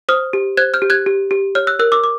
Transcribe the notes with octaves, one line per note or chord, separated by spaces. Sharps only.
C5 D#6 F6
G4
C5 F#6 G#6
F6 G6
G4
F#6 G#6
G4
G4
C#5 F6 G6
E6 F#6
A#4 E6 F#6
D6 E6
D6